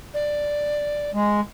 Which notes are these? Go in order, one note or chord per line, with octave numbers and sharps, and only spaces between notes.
D5
G#3